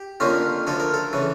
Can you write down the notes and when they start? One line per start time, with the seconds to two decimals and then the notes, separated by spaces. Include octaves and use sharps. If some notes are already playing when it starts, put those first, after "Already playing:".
Already playing: G4
0.20 F2 D3 F3 A#3 C#4
0.67 D2 D3 F3 A4
0.80 A#4
0.94 A4
1.13 C#3 E3